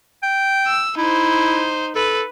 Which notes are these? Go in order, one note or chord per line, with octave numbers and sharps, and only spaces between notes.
G5
E6
D#4 E4 C5
A4 B4